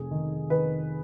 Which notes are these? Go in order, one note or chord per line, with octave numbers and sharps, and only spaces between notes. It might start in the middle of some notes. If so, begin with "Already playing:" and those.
Already playing: F1 G#4
D#3
D#3 B4